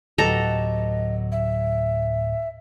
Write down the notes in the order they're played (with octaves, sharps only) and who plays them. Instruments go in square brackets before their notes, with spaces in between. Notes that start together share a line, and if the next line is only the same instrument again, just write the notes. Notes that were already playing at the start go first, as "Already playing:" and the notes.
[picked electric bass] D1 [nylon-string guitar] F#3 B3 G4 [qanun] A4 A#5 [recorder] D#5
[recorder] E5